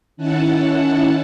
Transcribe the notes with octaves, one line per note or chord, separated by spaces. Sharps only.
D#3 C#4 E4 F#5 A5